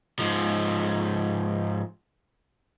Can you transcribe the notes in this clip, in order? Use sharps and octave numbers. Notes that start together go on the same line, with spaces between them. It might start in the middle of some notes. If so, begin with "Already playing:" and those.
G#2 F3